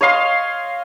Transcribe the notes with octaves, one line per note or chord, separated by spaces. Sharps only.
C#5 D#5 F5 C6